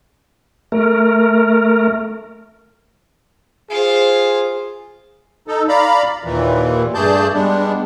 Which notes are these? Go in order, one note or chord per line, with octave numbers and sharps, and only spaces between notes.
A3 A#4
F4 G#4 C5
D#4 A4
D5 F5 A#5 B5
D#2 A#2 E3
G2 A3 G#4 D5 A5 G6
G3 G#3 B3 D4